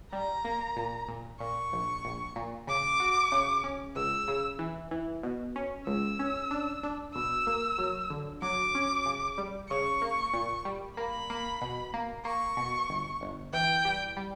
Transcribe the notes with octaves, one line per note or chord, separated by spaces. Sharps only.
G3 A#5
A#3
A#2
A#2
A#2 C#6
A#1
A#1
A#2
C#3 D6
F#4
C#3
C#4
C#2 E6
C#3
E3
E3
B2
C#4
C#2 E6
C#4
D4
D4
B2 E6
A#3
F#3
D3
F#3 D6
C#4
C#3
G3
C#3 C#6
A#3
A#2
G3
A#3 B5
A#3
B2
A#3
A#3 C#6
B2
G1
G1
E3 G5
G3
G3